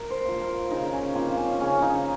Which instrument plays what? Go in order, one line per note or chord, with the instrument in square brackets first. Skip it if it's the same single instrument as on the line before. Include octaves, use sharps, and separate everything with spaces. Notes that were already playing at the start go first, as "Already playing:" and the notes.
Already playing: [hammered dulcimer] A#4
C5
F3 A#3
A#4
C#3 D#4
C#4
F3 A#3 C4
C#4
C#3 C#4
D#4